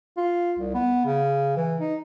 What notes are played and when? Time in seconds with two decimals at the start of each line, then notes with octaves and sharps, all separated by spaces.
0.17 F4
0.59 C2
0.75 B3
1.06 C#3
1.57 E3
1.80 D#4